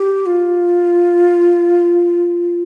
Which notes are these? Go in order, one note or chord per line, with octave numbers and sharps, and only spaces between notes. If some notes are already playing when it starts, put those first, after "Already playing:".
Already playing: G4
F4